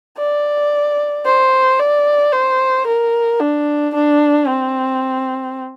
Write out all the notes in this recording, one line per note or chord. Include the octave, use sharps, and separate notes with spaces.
D5
C5
D5
C5
A#4
D4
D4
C4